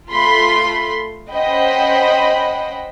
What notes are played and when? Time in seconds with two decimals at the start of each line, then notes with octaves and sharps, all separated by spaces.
0.11 A3 F4 B5 C6
1.32 C#4 C5 D#5 F#5 G5 B5